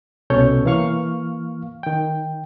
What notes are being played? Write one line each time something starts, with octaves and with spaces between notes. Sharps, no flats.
C2 B2 C#4 A4 C#5 G6
E3 A#3 F5 C#6 F6
D#3 G5